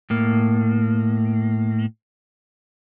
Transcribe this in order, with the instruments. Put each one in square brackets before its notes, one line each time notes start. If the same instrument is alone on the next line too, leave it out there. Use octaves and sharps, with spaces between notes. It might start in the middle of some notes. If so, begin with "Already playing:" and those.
[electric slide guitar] A2 A#3